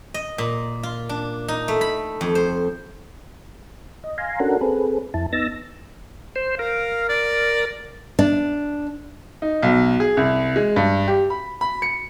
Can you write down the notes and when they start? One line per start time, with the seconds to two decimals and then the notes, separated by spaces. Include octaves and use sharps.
0.14 D#5
0.38 A#2
0.83 F4
1.09 D4
1.48 D#4
1.68 A3
1.81 B5
2.21 F2
2.35 C5
4.04 D#5
4.18 F5 G#5 A#5 C6
4.40 C#4 D4 F#4 A4 A#4 F#5
4.61 C4 G#4 A4 B4
5.14 F2 E4 A5
5.33 B3 D#4 E6 A6 A#6
6.36 C5
6.59 A#4 F5
7.09 D5
8.19 D4
9.42 D#4
9.63 B1
10.00 G#4
10.17 C2
10.56 G#3
10.76 G2
11.08 G4
11.30 B5
11.61 B5
11.82 C#7